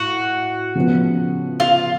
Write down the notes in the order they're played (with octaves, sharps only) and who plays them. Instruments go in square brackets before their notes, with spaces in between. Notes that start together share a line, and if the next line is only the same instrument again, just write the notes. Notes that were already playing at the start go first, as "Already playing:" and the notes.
Already playing: [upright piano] A2 [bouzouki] F#4
[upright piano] C#3 F3 B3
[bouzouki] F4